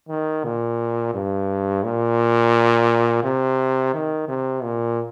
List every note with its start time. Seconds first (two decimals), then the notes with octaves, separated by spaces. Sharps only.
0.09 D#3
0.44 A#2
1.14 G2
1.84 A#2
3.24 C3
3.94 D#3
4.28 C3
4.63 A#2